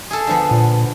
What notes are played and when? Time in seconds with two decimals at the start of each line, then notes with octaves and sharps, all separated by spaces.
0.11 G#4 A4
0.27 D3 F3 B3
0.51 A#2